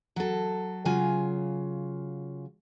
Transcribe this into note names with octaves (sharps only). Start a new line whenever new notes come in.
F#3 A4
C#3 F#3 F4 G#5